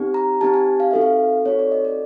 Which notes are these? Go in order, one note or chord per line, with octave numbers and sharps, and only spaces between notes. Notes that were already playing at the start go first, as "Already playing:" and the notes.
Already playing: C4 D#4 G4
A#5
C4 D#4 G4 A5
G#5
F5
C4 D#4 F#4 A4 E5
F5
C4 D#4 F#4 A4 C#5
D5
D#5
D5